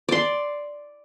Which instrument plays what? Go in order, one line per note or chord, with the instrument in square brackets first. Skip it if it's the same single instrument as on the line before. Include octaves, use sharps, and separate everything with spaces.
[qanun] D5 C6